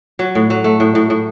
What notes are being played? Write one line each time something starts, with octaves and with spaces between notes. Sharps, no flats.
F#3
A2
F#3
A3
A2
A2
A2